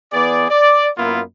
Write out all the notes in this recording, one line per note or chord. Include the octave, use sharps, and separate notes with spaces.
E3 B3 G#4 D5
D5
F#2 A#3 B3 E4 F4